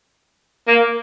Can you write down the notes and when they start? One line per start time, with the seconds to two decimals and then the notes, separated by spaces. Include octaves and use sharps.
0.68 A#3